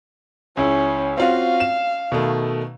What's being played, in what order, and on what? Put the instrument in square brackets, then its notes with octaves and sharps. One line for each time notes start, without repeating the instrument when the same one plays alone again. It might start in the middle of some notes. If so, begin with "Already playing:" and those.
[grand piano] C#2 E4 [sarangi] C#4
[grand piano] C4 F4 F#4 [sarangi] F5
[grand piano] E7
B2 D#3 A3